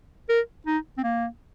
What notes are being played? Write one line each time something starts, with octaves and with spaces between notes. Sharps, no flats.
A#4
D#4
C4
A#3